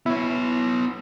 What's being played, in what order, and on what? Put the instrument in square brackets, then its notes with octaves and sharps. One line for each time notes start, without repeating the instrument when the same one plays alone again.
[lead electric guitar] B3 C#5 [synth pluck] E4